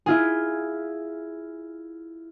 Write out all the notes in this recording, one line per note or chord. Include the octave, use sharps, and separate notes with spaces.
E4 F4 G#4